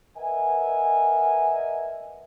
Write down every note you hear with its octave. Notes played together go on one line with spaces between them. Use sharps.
A#4 B4 D#5 E5 F#5 G#5